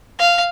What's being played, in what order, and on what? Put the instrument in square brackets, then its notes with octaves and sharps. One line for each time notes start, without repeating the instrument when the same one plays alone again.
[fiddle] F5